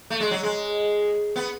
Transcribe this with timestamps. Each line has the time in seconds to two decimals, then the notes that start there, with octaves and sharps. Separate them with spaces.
0.10 A3
0.20 G#3
0.31 F#3
0.43 G#3
1.36 B3